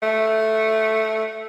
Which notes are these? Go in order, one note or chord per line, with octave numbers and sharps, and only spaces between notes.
A3